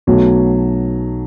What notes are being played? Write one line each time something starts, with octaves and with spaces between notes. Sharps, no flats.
B1 B2 F#3 A3